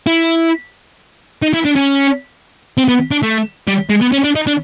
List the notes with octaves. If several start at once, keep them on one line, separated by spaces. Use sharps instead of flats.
E4
D#4
E4
D4
C#4
C4
B3
D4
A3
G3
G#3
B3
C#4
D4
D#4
D4